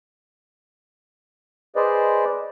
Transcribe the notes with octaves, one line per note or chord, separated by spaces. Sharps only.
G#4 B4 C5 D5 D#5